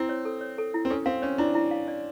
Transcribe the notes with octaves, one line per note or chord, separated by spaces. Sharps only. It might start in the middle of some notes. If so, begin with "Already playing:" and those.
Already playing: C4 E4
C#5
A4
C#5
A4
E4
C4
C#4 A4
C4 F5
C#4 C#5
D4 E4
E4
F5
D5